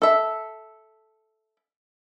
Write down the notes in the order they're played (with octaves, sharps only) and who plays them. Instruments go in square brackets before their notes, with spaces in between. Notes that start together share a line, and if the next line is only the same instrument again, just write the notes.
[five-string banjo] A4 E5